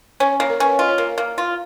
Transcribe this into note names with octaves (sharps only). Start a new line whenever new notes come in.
C#4 C#5
A#3 C#5
A#4
C#4 B4
C#5
F4 D#5
C#5
A#3 A#4
A#3
F4